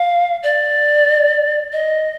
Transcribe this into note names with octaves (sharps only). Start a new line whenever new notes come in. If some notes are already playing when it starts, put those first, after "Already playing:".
Already playing: F5
D5
D#5